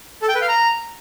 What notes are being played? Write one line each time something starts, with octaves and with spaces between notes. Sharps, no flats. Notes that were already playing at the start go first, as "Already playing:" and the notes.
A4
G5
B4
F5
A#5